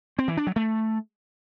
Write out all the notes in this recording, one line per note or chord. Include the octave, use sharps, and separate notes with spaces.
C4
E3
D4
F#3
A3